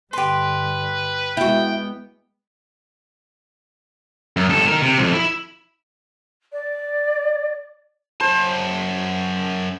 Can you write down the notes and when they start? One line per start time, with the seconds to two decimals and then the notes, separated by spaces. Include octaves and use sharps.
0.13 G2 D3 G4 B4 C6
1.37 G#3 B3 E4 F#4 G5
4.37 F#2
4.49 G2 A4
4.68 D#4 A#4
4.82 C3
4.99 C2 F2
5.13 E4
6.52 D5
8.21 F#2 C5 A5